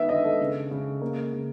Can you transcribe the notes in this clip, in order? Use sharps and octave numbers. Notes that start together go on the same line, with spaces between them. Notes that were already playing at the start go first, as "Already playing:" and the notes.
Already playing: D#3 B3 E5
D3 D#5
A4
C#3
C#3
A#3
C#3